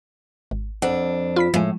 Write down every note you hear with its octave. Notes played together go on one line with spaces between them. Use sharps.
G#1
F2 D4 F#5
F4 B5 B6
A2 F3 G#3